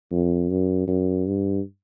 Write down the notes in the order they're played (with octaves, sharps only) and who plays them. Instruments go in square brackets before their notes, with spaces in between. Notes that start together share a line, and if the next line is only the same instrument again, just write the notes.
[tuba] F2
F#2
F#2
G2